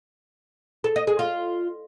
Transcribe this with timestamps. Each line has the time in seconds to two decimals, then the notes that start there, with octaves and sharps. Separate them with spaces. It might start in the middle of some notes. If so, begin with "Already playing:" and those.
0.84 A4
0.96 D#5
1.07 G#4
1.19 F4